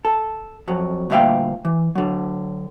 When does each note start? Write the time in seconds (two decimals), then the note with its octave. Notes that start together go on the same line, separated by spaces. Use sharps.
0.05 A4
0.68 F2 F#3
1.10 D2 G2 A#2 E5 F5 G5
1.65 E3
1.95 D3 F#3